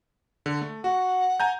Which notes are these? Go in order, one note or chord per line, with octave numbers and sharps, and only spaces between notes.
D3
A3
F#4 F#5
G#5 A#5 G6